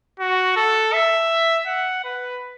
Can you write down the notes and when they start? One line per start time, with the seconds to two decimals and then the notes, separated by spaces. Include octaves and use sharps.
0.19 F#4
0.57 A4
0.93 E5
1.67 F#5
2.04 B4